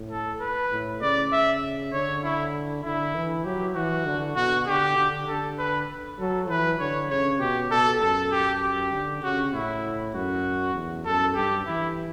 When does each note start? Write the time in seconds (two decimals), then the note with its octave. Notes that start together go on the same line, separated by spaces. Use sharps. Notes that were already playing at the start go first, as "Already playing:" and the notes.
Already playing: A2
0.11 A4
0.41 B4
0.72 A2
1.02 C#3 D5
1.32 E5
1.92 D3 C#5
2.24 E4
2.84 D3 E4
3.15 E3
3.45 F#3 G4
3.76 E3 F#4
4.06 D3
4.36 B2 F#4
4.67 D3 G4
4.97 D3
5.27 D3 A4
5.59 B4
6.19 F#3 A4
6.49 E3 B4
6.80 D3 C#5
7.10 C#3 C#5
7.40 B2 G4
7.71 B2 A4
8.02 F#2 A4
8.32 G4
8.62 G4
8.92 D3
9.23 C#3 F#4
9.54 A2 E4
10.14 F#2 F#4
10.75 E2
11.06 F#2 A4
11.35 G2 G4
11.67 E3 E4